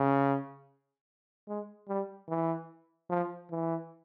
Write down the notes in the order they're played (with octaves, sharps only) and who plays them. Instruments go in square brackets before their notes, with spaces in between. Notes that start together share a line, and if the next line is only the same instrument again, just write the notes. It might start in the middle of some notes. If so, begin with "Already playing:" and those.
Already playing: [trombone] C#3
G#3
G3
E3
F3
E3